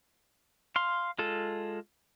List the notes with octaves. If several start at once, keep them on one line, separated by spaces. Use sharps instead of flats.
F5 C6
G#3 F4 A4